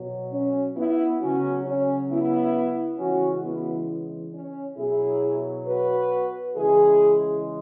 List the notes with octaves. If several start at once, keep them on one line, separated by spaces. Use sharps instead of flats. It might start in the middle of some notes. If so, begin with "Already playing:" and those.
Already playing: B2 F#3
C#4
B3 E4
C#3 F#3 C#4 F#4
C#4
B3 E4
C#3 E3 G#3 C#4 F#4
B3 E4
C#4
B2 F#3 E4 G#4
F#4 B4
C#3 E3 G#3 E4 G#4